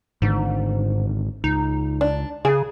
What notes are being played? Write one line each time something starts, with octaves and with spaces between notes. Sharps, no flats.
G#1 G#2 D3
C#2 D#4
D4
C#3 G#4